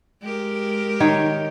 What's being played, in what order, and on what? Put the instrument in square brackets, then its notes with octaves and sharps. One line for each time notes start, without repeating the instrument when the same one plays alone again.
[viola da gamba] G#3 G4 A#4
[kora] D#3 C#5 G5